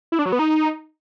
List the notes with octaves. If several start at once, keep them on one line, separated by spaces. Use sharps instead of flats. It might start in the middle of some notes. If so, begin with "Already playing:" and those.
E4
D4
F#3
B3
D#4